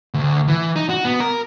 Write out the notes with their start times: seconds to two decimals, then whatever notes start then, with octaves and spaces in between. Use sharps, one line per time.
0.14 D2
0.48 E3
0.76 D#4
0.89 F#4
1.05 B3
1.20 A#4